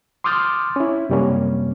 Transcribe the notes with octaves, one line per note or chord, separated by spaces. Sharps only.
C6 D6 D#6 F6 G6 A6
C#4 E4
F#2 C3 G3 A#3 C#4